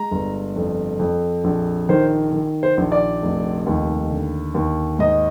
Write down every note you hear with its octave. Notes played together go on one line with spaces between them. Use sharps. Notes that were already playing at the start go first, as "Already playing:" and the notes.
Already playing: G#3 A#5
G1
F2
F2
A#1
D#3 C5
D#3
C5
A#1
D5
F1
D#2
D3
D#2
G#2 D#5